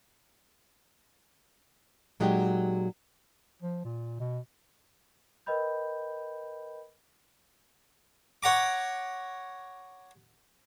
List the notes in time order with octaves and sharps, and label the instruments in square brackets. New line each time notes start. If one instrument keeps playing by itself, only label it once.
[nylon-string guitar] A#2 F#3 G#3 D#4 F#4 G4
[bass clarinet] F3
A#2
B2
[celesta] A#4 B4 D#5 G5 B5 G6
[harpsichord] C#5 F#5 A#5 D6